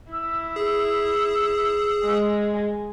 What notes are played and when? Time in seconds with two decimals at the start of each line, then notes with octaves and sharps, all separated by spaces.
0.11 E4 E6
0.56 G#4
2.04 G#3